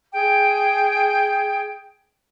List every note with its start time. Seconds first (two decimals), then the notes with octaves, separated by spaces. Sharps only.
0.13 G#4 G5